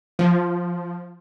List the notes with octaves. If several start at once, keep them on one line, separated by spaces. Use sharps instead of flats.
F3